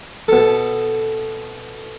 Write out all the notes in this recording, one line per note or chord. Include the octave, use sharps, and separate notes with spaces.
B2 A4